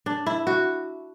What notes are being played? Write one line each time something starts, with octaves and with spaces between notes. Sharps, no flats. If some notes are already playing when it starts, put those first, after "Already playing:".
D4
E4
F#4